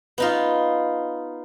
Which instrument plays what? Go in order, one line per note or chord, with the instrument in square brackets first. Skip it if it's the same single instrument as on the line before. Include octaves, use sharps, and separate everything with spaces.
[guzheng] B3 D#4 F4